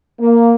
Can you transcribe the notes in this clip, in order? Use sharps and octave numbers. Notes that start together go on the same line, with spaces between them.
A#3